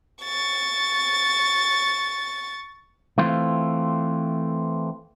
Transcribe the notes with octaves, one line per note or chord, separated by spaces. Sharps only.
C#6 A6
E3 A3 C4 F4